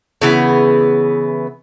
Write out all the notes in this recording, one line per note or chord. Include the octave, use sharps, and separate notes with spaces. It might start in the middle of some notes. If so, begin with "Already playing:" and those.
C#3 E3 B3